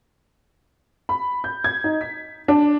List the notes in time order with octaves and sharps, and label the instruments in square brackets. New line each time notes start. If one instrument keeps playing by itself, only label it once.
[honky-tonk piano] B5
G6
G#6
D#4
B6
D4